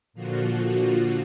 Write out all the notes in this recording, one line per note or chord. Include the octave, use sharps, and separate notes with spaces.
A#2 D3 F3 F4 F#4